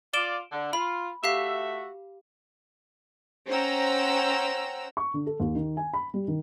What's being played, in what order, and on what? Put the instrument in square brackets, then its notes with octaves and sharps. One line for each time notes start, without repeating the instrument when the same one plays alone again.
[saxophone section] F4 D5 [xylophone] D7 E7 G7
[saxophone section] D3
[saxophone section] F4 [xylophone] B5
[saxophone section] A3 F#4 E5 [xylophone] G4 F5 B6
[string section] C#4 C5 F#5 G5 A#5 E6
[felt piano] C#6
D3
A4
D#2
D#3
G#5
B5
G3
D#3